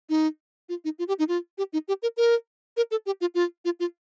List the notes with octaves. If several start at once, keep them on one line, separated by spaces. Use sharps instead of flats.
D#4
F4
D#4
F4
G4
D#4
F4
G4
D#4
G4
A#4
A#4
A#4
A4
G4
F4
F4
F4
F4